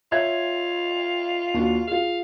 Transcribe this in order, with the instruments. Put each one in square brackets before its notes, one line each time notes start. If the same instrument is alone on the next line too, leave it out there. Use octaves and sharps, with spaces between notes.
[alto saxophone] F4 [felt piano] C#5 E5 G#6
[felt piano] D#2 D4 F#4
[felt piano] F4 G#4 [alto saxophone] F5